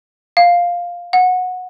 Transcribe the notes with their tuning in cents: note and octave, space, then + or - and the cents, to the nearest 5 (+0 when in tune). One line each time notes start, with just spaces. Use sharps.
F5 +5
F#5 -15